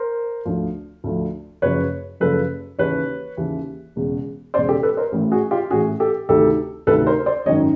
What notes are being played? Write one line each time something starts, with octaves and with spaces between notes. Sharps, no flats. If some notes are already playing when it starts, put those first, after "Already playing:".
Already playing: A#4 C5
D2 D3 F3
D2 D3 F3
F#1 F#2 C#3 F3 B4 C#5
F#1 F#2 C#3 F3 A4 B4
D#2 C#3 E3 B4 C#5
D#2 C#3 E3
E1 E2 C#3
E1 E2 C#3 C5 D5
G4 A4
A4 B4
A#4 C5
A1 A2 E3
F#4 G#4
F4 G4
A1 A2 E3 F#4 G#4
G4 A4
D2 C3 D#3 G4 A4
D2 C3 D#3 A4 B4
A#4 C5
C5 D5
G#1 F#2 D#3 C#5 D#5